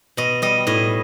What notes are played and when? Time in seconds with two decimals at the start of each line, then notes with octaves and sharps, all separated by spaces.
0.17 B2 D#5
0.42 G3 D#5
0.67 A2 D#5